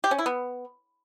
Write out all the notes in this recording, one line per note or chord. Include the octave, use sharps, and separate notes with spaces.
G4
C#4
E4
B3